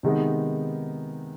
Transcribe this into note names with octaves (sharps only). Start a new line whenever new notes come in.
C3 D#3 G#3 B3 D#4